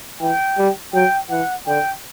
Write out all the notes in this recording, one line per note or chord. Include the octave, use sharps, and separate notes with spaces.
E3 G5
G3
F#3 G5
E3 F#5
D3 G5